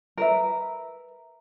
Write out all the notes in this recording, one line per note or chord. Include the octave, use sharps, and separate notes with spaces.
A#4 B4 E5